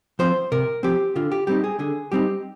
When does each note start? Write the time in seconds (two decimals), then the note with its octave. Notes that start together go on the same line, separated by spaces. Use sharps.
0.19 F3 C4 C5
0.52 C3 A#4
0.83 F3 C4 G4
1.16 D3 F4
1.32 G4
1.47 G3 C4 D#4 G4
1.64 G#4
1.79 D3 G#4
2.12 G3 C4 D#4 G4